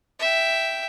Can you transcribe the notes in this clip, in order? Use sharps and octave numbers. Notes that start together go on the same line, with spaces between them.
E5 G5